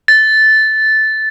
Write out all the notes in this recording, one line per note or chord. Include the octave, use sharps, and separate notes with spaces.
A6